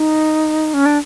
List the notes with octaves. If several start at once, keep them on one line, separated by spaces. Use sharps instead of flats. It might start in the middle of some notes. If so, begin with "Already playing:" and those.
Already playing: D#4
C#4
D4